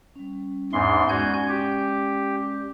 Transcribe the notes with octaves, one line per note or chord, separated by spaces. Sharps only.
G3 C#4
E2 G#2 D4 D#4 E5 C6
G#3 C#4 F#4 D5 G#5 G6
G4